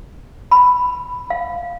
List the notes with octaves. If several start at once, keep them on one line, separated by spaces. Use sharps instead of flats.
B5
F5